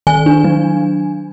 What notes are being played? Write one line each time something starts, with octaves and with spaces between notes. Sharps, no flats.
D#3 G#5
D4
F#3